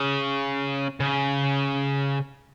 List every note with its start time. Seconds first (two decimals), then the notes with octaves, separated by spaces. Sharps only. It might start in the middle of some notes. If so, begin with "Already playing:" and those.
Already playing: C#3
1.00 C#3